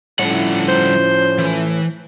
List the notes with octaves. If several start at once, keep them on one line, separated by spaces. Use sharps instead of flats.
A2 D3 F3 G3 C#4 F#5
C5
E3